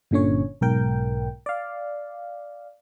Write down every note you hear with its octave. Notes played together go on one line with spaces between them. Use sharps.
G1 A#2 D3 C#4 C#5
B1 G#2 A#4 G5
D5 F5